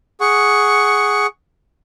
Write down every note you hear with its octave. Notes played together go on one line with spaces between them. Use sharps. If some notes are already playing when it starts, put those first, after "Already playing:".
G#4 F#5 C#6